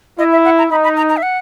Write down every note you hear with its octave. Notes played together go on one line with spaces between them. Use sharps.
E4 D#5
E5
F#5
A#5
D#4 B5
B5
A#5
A#5
E5
F#5